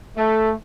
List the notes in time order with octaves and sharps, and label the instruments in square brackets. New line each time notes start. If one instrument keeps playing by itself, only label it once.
[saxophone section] A3